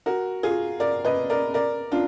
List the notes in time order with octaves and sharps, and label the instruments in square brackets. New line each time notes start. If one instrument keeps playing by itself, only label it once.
[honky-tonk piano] F#4 A#4
F4 G#4
A#4 D5
B4 D#5
A#4 D5
A#4 D5
D4 F4